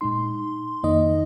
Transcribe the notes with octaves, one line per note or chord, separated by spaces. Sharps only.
A#2 G#3 D#4 C6
F2 D#3 A#3 D#4 D#5